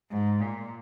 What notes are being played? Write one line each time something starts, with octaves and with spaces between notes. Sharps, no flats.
G#2
A#2